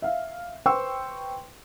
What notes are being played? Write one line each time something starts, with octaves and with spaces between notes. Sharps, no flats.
E5 F5
B4 C5 G5 C6 C#6 E6